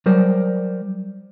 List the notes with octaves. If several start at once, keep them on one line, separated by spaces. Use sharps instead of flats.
F#3 G3 A#4 C5 D5